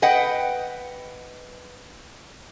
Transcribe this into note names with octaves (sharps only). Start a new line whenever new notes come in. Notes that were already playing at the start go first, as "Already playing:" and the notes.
B4 D#5 F#5 G5